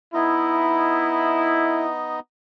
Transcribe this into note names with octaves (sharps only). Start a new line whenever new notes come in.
B3 D#4 E4 D#5